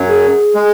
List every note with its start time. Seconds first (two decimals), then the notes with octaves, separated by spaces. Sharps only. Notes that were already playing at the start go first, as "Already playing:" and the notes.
Already playing: F#2 F#3
0.09 G#4
0.55 G#3